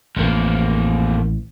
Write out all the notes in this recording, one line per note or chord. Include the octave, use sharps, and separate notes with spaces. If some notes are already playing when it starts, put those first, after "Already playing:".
A1 F2 A#3